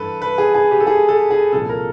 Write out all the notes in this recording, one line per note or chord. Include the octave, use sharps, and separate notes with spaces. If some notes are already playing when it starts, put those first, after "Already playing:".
Already playing: G2 E3 A4 B4
B4
G#4
G#4
G4
A4
G#4
A4
G#4
C2 A#2 F3 A4
A#4